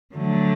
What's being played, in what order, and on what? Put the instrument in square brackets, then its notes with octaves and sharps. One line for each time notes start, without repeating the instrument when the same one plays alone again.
[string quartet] D3 F#3 A3